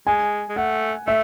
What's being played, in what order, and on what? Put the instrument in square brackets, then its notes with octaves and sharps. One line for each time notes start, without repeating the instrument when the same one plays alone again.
[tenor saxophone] G#3 [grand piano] G#5
[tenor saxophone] G#3
[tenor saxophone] A3 [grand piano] F#5
[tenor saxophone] A3 [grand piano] E5